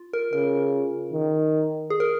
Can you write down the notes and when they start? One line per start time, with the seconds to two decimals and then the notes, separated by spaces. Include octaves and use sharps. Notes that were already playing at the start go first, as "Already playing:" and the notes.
Already playing: F4
0.13 A#4
0.33 C#3 A#4
1.12 D#3
1.90 G#4
2.00 A#4